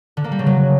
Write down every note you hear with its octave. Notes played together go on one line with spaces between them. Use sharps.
D3
A#3
G3
C#3
F#3